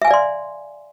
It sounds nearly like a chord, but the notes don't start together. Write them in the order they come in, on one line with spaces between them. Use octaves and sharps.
E5 G#5 F5 D5 C6